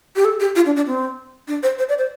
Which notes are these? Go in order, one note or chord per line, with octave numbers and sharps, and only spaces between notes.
G4
A4
G4
F4
D4
D4
C4
D4
C5
C5
D5
C5